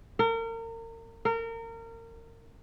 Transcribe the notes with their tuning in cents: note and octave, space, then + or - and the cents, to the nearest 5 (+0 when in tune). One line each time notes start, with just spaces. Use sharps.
A#4 -35
A#4 -30